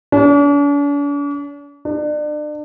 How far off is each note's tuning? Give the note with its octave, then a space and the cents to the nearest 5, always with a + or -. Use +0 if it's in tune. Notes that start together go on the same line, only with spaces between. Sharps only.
D4 -45
D4 +35